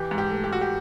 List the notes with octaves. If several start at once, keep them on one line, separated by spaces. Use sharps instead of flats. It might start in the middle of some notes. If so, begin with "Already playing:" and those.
Already playing: E3 G4
G#2
G4
A3
G4
G#2 F#4
G4